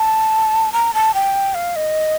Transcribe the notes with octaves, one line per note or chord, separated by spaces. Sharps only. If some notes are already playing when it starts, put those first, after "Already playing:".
Already playing: A5
A#5
A5
G5
F5
D#5